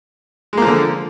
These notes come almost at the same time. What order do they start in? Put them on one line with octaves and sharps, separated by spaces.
G#3 A#3 F3 D3